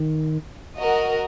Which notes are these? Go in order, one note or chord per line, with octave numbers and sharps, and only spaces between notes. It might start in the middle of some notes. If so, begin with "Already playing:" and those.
Already playing: D#3
F#4 A#4 D#5